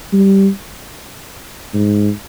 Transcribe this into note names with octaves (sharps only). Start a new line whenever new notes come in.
G3
G#2